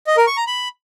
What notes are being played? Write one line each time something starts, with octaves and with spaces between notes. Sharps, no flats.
D#5
A#4
C#6
A#5
B5